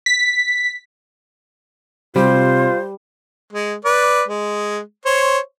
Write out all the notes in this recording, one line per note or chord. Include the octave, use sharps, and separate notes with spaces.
B6
C3 G3 F4 C5
G#3
B4 D5
G#3
C5 C#5